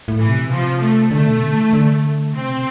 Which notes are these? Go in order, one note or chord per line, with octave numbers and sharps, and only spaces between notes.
A2
E3
C3
B2
C3 F3
A3
D3 A3
B2
D3
E3
D3
C3 C4
B2